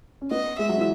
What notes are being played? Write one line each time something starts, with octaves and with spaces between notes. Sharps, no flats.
C#4
B3 D#5
G#3 E5
F#3
E3